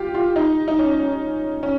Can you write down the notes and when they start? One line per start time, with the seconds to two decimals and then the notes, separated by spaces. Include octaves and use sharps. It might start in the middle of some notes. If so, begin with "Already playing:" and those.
Already playing: F4 G4
0.15 F4
0.36 D#4
0.68 D#4
0.79 C#4
0.99 C#4
1.63 C#4